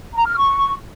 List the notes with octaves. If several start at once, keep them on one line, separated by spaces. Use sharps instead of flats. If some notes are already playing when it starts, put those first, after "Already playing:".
A#5
F6
C#6